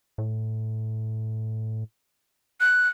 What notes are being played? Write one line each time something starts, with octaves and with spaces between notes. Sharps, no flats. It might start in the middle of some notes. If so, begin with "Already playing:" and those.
A2
F#6